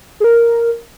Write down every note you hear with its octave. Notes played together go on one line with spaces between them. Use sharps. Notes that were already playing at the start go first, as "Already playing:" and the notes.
G#4
A#4